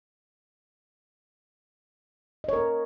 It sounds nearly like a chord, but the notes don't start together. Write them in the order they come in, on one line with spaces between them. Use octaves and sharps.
D#5 C#5 A#4